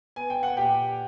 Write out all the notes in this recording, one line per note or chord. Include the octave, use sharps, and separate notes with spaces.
B3 G#5
G5
F#5
A#2 G4 G5